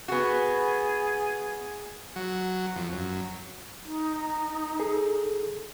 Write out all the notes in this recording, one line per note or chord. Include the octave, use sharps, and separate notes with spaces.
B3 F#4 G#4
F#3
F2
F#2
D#4
G#4 A4